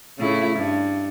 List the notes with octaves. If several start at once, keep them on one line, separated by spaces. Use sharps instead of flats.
A2 C#3 E4
G2